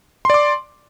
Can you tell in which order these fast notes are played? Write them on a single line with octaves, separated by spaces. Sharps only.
C6 D5 D6